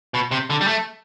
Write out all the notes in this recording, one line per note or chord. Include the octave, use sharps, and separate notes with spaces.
B2
C3
D3
G3
A3